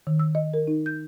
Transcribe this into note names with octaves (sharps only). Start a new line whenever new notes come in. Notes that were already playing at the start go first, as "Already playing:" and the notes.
D#3
E6
D#5
A#4
D#4
G6